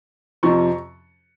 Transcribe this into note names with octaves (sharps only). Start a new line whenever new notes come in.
F2 C3 F3 A#5 C#6